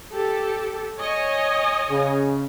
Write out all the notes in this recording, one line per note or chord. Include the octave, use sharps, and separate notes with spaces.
G4 A4
C#5 D#5 G#5
C#3